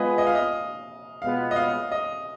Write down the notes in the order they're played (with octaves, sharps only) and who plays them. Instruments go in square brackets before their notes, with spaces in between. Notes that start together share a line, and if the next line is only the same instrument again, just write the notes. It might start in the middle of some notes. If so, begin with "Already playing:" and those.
Already playing: [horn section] G#3 B3 F4 G#4 B4 [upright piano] D#5
[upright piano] D#5
F5
D#5
[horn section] B2 G#3 B3 F4 [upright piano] F5
[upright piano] D#5
F5
D#5